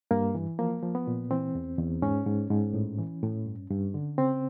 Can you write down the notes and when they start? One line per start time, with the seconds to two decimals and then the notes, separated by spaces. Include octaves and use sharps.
0.11 G2 A#3
0.35 E3
0.59 F3 A#3
0.82 F3
0.95 B3
1.07 A#2
1.31 E3 C4
1.55 E2
1.79 E2
2.02 G#2 C#4
2.27 G#2
2.51 G#2
2.74 A2
2.99 E3
3.22 A2
3.46 G2
3.70 G2
3.94 D3
4.18 C#3 C4